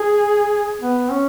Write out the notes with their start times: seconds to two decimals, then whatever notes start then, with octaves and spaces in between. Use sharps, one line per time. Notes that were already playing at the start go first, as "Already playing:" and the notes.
Already playing: G#4
0.82 B3
1.11 C#4